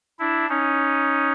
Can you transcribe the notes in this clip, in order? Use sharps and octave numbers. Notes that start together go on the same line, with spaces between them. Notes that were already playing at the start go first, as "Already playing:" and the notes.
D4 E4
C#4 D#4